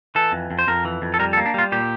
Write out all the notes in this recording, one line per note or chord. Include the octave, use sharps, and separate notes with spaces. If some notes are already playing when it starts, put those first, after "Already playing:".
E3 A4
F2
F2
C5
F2 A#4
E3
F2
A4
G3 A#4
A4
A#3
D4
G3 F4
A#2 G4